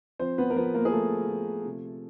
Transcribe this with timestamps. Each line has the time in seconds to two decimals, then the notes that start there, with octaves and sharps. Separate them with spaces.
0.19 F3 C4 C5
0.38 B3 B4
0.50 A#4
0.56 F3 B3 B4
0.74 A#3 A#4
0.85 G#4
0.92 F3 A3 A4
1.29 F3
1.65 C3